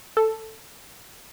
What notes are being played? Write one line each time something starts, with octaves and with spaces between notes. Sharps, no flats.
A4